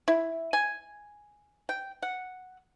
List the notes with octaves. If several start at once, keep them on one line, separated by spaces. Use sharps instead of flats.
E4
G#5
G5
F#5